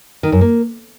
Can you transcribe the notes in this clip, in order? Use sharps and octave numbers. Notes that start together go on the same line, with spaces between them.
D#3
F#2
A#3